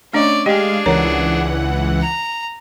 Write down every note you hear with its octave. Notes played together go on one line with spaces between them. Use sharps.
A3 C#4 D4 D5 D#5
G#3 D4 G4 G#4 D#5 F5 G5
C#2 E3 A#4 C#5 F#5 A#5
A#5